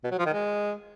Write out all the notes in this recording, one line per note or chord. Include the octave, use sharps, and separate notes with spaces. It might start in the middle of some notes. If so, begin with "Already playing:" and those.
B2
F#3
F3
D#3
G#3